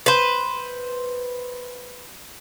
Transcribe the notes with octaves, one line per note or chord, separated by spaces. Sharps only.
B4 C5